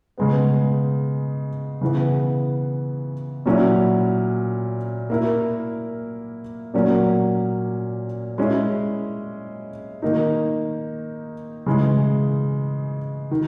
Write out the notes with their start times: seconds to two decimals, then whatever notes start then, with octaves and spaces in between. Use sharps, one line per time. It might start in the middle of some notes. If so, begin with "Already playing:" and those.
0.18 C#3 G#3 B3
1.81 C#3 E3 B3
3.46 A#2 F#3 C#4 E4
5.10 A#3 E4 A#4
6.74 A#2 F#3 A#3 C#4
8.38 G#3 C#4 E4
10.02 D#3 A#3 D#4
11.66 C#3 E3 G#3
13.31 D#3